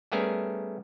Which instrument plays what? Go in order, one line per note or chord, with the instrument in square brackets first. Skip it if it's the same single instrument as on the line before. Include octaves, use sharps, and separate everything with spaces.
[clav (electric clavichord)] G3 A3 B3 C#4 G#4 A#4